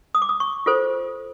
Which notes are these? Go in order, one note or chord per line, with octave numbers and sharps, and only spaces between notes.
D#6
D6
D#6
C#6
F4 A4 C5